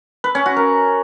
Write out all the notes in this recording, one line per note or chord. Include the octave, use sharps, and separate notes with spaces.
B4
C#4
F#4
A#4